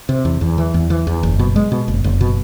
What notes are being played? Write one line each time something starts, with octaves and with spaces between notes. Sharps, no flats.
C3
E2
E2
E3
E2
E3
E2
F#1
B2
G#3
B2
F#1
F#1
B2